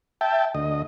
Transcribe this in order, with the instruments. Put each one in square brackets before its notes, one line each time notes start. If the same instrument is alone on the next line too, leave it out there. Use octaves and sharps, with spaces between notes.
[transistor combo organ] E5 G5 A5
D2 D#5